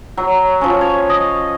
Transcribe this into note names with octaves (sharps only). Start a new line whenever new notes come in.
F#3
F3 C#4
C#5
D#5